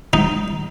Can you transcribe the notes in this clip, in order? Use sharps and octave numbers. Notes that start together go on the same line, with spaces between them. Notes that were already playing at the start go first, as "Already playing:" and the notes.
D#4